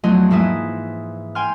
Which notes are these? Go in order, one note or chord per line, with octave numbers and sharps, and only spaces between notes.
E2 F3 F#3 A3 D#5 C6
G#2 E3 A#3 E4 E5 D#6
G5 G#5 C6 F6